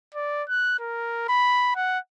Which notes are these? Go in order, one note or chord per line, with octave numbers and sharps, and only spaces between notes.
D5
F#6
A#4
B5
F#5